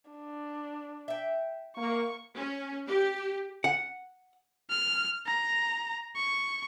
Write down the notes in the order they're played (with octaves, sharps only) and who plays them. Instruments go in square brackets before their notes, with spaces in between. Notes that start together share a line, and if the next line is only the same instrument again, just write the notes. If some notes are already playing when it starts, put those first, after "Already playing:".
[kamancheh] D4
[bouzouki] E5 G5
[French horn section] A#3 [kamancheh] C#6
[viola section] C#4
G4
[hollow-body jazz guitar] F#5
[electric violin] F6
A#5
C#6